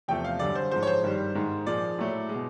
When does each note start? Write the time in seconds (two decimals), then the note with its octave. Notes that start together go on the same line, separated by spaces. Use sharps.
0.08 E2 C3 F3 A3 G5
0.24 F5
0.39 F#2 D3 G3 D5
0.55 C5
0.71 G#2 F3 G#3 C5
0.83 C#5
0.87 C5
1.03 G2 D#3 G3
1.35 G#2 D#3 G#3
1.66 A#2 F3 G#3 D5
1.98 A2 F#3 A3
2.29 G#3
2.34 B2